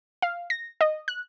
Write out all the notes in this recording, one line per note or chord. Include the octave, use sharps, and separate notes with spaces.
F5
A#6
D#5
F#6